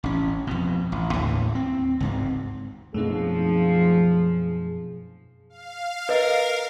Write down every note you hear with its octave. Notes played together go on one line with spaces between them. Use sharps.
A1 C#4
F2 B2
A1
D#2 A2 D3 E3
C4
C#2 G#2 C4
F#2 B2 F3 A3 B3 C4 D#4 G#4
F5
A#4 B4 D#5